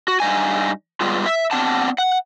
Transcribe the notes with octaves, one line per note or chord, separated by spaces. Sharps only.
F#4
G2 D#4 G#5
G3 G#3 B3 F4
E5
B3 C4 D4 F#5 A5
F#5